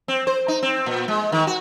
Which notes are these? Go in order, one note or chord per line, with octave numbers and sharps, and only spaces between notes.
C4
C5
D#4
C4
A#2
G#3
D#3
F#4